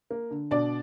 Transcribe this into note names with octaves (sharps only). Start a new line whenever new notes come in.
A#3
D3
B2 D4 D5